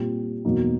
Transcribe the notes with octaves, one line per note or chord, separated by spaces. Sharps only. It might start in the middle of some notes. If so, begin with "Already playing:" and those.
Already playing: A#2 G3 C4
E2 B2 F#3 A#3 D#4